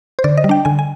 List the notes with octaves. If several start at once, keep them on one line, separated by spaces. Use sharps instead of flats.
C5
D3 D5
D#5
G3
D4 G5
D3 G#5
G#5